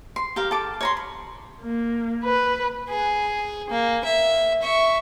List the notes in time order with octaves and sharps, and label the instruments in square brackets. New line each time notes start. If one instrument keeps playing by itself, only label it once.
[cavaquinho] C6
G4 A#4 F5
A4 D6
C#5 A#5 C6
B5
[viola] A#3
B4
[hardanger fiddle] G#4
A#3
E5
E5 C#6